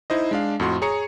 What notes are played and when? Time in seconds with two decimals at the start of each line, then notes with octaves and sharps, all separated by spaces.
0.10 D#4 E4 C5 D#5
0.31 G#3 D4 F5
0.60 F2 A2 F#4 C6
0.82 G#4 C#5 A#5 C#7